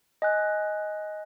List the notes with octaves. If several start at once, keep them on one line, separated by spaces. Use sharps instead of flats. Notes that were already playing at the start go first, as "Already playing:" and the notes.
D#5 G#5 F#6